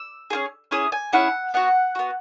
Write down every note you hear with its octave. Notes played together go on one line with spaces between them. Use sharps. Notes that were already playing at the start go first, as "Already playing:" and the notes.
Already playing: E6
C#4 E4 G#4
C#4 E4 G#4 D#6
G#5
C#4 E4 G#4 F#5
B3 F#4 F#5
B3 F#4